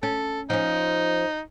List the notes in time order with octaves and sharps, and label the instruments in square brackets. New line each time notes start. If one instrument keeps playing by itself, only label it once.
[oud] C#4 [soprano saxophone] A4
[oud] F3 C#4 [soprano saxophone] D#4